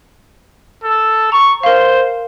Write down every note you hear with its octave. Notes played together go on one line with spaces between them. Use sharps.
A4
A#5 C#6
A#4 C5 F5